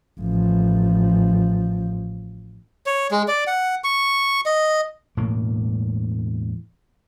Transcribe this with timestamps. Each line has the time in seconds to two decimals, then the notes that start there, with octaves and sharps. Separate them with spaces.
0.20 A1 F3
2.86 C#5
3.11 G#3
3.28 D5
3.47 F#5
3.84 C#6
4.46 D#5
5.17 E1 A2 A#3